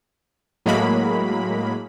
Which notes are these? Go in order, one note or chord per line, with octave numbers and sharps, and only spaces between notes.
A2 F#3 G#3 A#3 B5